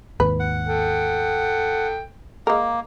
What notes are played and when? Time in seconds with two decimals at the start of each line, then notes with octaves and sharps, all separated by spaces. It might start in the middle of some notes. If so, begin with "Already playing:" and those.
0.20 D#2 G#2 B4
0.40 F#5
0.67 A4 G5
2.47 G#3 A#3 A#4